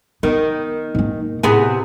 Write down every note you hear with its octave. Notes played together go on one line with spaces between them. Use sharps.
D#3 B3
G#2 A#3
A2 C3 B3 G#4